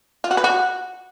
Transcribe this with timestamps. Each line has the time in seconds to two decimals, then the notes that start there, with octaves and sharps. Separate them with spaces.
0.24 F4
0.31 F#4
0.37 B4
0.44 F#4